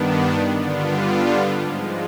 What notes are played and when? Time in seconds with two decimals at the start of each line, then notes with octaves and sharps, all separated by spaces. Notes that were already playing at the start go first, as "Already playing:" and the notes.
Already playing: G2 D#3 B3 D4
0.54 D3 G3 B3 D4 F4
1.57 G#2 F3 G#3